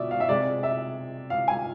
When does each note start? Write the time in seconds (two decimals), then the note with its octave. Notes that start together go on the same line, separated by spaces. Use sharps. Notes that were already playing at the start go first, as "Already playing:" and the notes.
Already playing: B2 D5 E5
0.11 F5
0.20 E5
0.29 C3 G#3 D5
0.63 E5
1.30 F5
1.48 G#5